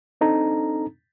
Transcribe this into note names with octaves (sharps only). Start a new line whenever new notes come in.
C4 D4 D#4 A4 A#5